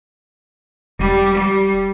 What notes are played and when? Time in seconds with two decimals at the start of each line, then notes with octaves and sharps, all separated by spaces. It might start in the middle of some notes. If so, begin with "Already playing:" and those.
0.99 E1 G3
1.34 G3